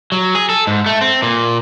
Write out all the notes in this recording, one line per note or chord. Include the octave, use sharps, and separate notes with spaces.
F#3
G#4
A4
G#2
A3
C4
A#2